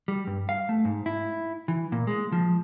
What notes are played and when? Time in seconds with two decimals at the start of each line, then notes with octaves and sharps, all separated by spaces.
0.08 G3
0.27 G2
0.49 F5
0.69 A3
0.85 G#2
1.06 E4
1.68 E3
1.92 A#2
2.07 G#3
2.32 F3